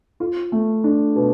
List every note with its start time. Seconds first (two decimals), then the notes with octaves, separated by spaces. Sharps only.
0.20 F4
0.52 A3
0.84 D4
1.16 B2